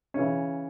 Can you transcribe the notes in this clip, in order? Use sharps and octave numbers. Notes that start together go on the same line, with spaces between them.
C#3 E3 C#4